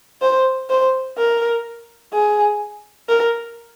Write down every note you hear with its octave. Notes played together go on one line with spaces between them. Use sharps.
C5
C5
A#4
G#4
A#4